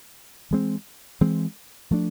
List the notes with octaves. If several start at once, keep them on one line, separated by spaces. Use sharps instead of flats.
E3 G#3 C4
E3 G#3 C4
F3 A3 D4